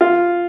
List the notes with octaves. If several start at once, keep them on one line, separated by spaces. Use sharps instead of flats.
F4